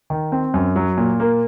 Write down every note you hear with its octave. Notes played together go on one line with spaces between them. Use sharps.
D#3
C4
F#2
F#3
A#2
A#3